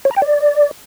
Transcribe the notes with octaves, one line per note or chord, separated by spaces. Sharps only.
C#5
A#5
G5
D5